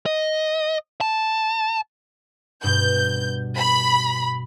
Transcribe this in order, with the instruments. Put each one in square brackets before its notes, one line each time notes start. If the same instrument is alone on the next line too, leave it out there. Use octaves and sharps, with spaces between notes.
[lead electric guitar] D#5
A5
[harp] G2 B2 [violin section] G6
[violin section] B5